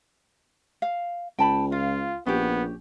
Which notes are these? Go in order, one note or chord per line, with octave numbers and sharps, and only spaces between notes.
F5
C#2 G5 A5 B5
F4 F5
A#1 B3 C#4 G4